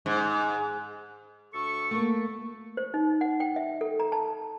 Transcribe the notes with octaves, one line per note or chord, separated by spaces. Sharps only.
G#2
D2 A4 C#6
A3 A#3
C5
D#4
F#5
G5
E5
A4
A#5
A5